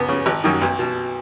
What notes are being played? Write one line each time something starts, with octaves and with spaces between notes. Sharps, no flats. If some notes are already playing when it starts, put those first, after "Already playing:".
Already playing: C#2 B3
C#3
G#1
F#2 D#3
B1
B2